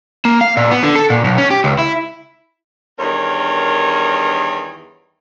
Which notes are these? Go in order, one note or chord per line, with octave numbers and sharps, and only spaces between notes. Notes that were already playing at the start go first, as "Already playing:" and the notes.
A#3
F5
A#2
B3
D3
A4
A#2
B1
C#4
G4
C#2
E4
E2 G2 D#3 A#4 C#5